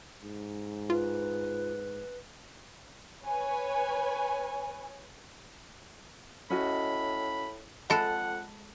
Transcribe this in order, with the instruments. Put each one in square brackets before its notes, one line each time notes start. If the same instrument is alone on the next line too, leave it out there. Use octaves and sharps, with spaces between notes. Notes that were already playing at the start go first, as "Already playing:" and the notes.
[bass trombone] G#2
[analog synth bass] F4 [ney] B4
[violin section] B4 C#5 G#5
[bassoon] A2 [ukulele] C#4 F#4 D#5 [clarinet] B5
[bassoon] F2 [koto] G#3 A4 [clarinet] F#5 [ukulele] B5